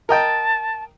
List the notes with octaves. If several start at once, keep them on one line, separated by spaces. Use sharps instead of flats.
A#4 D#5 G5 A5